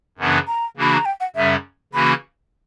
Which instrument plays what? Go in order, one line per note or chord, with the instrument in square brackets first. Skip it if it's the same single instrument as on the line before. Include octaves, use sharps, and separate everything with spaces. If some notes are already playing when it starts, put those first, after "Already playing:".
[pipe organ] F#2 C#3 E3 B3 D4
[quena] A#5
[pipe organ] C#3 E3 A#3 D4 F#4 [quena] B5
[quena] A#5
G5
F#5
[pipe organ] F#2 C#3 G3 C#4 [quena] E5
[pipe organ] C#3 E3 A#3 C#4 F#4 [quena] B5